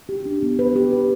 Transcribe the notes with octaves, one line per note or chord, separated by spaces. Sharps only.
G4
D4
B3
B4
G4
B4